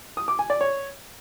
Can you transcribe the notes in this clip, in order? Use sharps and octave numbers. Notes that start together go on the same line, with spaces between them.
D#6
D6
G#5
D5
C#5